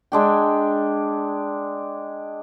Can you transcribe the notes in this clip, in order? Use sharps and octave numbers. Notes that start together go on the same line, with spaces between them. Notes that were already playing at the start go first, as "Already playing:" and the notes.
G#3 D4 G5